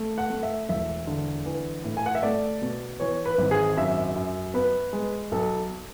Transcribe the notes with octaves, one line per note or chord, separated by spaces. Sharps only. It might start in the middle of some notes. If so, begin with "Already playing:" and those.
Already playing: A3
F#5
A3
E5
E1 E5
D3
E3
A2
G#5
F#5
E5
A3 D5
B2
E3 C#5
B4
G#1
G#4
F#2 E5
F#2
B3 B4
G#3
B1 A4